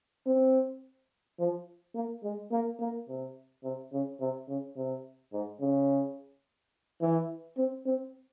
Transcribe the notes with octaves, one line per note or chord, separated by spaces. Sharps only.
C4
F3
A#3
G#3
A#3
A#3
C3
C3
C#3
C3
C#3
C3
G#2
C#3
E3
C4
C4